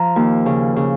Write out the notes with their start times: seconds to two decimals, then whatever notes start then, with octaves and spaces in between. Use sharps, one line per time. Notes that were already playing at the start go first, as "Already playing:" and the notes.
Already playing: F3 A#5
0.16 D#2
0.46 C#3
0.76 C#3